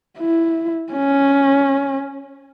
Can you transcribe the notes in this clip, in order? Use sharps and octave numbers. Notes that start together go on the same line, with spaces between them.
E4
C#4